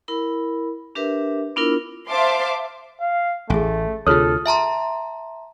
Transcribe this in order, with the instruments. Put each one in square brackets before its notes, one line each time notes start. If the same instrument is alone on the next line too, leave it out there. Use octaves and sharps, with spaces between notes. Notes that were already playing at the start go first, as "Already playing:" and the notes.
[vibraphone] E4 A#4 B5
D4 G4 A#4 B4 E5
B3 D4 E4 F4 A#4
[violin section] C5 E5 F5 A5 C6 D6
[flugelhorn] F5
[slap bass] A1 [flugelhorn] A3 [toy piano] G#4 G#5
[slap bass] D2 C3 [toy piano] F4 G#4 C#5 [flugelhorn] A4 [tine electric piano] D#6 F6
[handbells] E5 A5 A#5 C6